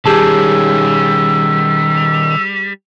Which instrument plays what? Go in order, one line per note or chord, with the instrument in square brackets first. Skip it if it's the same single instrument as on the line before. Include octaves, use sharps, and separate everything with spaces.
[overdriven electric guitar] D#3 C#4 [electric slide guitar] G3 [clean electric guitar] G4 G#4 A5 [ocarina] E6